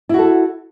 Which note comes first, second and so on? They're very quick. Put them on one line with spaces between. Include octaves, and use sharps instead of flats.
E4 F#4 A4